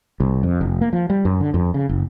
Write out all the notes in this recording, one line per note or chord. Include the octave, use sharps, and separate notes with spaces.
C2
F2
F1
A#3
F3
G3
F#2
D3
F2
C#3
F#1